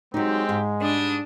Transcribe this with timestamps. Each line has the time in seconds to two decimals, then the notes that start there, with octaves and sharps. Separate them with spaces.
0.14 F#3 G#3 C4 D#4 G4
0.49 G#2
0.81 G3 D4 D#6